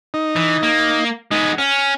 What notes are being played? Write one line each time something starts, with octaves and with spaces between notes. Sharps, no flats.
D#4
E3
A#3
G#3 B3 D#4
C#4 F6